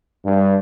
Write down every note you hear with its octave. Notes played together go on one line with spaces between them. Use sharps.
G2